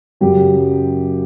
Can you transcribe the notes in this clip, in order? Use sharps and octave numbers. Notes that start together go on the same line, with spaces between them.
F#2 C#3 F#3 G4